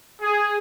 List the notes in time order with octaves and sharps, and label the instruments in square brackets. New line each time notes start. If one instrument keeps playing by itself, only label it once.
[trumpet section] G#4